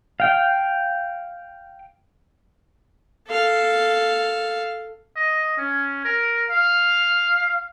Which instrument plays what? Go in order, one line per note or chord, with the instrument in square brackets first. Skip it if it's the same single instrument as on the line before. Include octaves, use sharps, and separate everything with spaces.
[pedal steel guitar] F5 G5
[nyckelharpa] A4 F5
[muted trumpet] D#5
C#4
A#4
F5